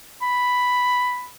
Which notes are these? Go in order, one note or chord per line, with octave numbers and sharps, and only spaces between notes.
B5